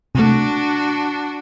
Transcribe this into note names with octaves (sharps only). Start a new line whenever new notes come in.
C3 A3 D4 F#4